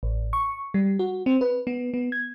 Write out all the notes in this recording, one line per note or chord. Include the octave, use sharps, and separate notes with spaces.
A1
C#6
G3
F#4
C4
B4
B3
B3
G#6